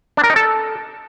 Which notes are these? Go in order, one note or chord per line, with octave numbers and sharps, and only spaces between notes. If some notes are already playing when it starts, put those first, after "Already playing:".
D4
A#4
D#4
A4